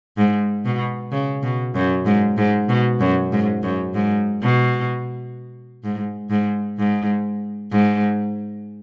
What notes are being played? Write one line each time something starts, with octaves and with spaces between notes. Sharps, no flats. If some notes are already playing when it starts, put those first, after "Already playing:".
G#2
B2
C#3
B2
F#2
G#2
G#2
B2
F#2
G#2
F#2
G#2
B2
G#2
G#2
G#2
G#2